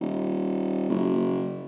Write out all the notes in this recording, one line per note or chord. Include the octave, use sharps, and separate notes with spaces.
D#1
F#1